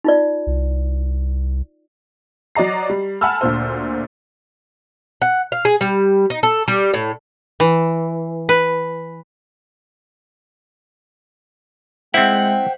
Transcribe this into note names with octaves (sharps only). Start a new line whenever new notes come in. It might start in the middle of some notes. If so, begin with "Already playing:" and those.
D#4 F4 D5
C2
F#3 D5 D#5 A#5 C7
G3
F#5 G#5 A5 B5 E6 F6
D2 A#2 C5
F#5
F5
G#4
G3
D#4
A4
G3
A2
E3
B4
G#3 C4 E4 C5 E5 F#5 G5